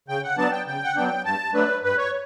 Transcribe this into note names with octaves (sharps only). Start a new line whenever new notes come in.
C#3 G5
F#5
F#3 B3 D4 A5
G5
C#3 G5
F#5
F#3 B3 D4 G5
G2 A5
F#3 A3 D4 B4
G2 B4
C#5